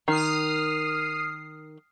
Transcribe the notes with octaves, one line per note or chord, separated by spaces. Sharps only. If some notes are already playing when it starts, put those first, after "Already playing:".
D#3 D#6 F6 C7